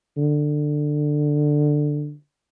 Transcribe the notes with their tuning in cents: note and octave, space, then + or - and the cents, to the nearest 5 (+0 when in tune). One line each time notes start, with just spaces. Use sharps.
D3 +15